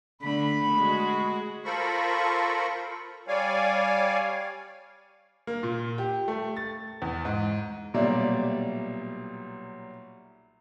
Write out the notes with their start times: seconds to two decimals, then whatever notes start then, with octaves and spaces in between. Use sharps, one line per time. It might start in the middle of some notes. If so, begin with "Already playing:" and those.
0.22 D3 A3 B5
0.74 G#3 F#4
1.64 F4 A4 A#4 C5 B5 C#6
3.28 G3 C#5 D5 F5 G#5
5.47 A#3
5.63 A#2
5.98 G4
6.28 A3
6.56 A6
7.02 E2
7.25 G#2
7.94 B1 A#2 G3 D5 E5